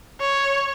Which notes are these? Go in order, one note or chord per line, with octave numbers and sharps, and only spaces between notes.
C#5